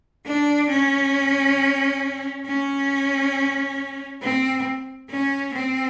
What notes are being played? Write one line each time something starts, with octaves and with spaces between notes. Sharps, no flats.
D4
C#4
C#4
C4
C#4
C4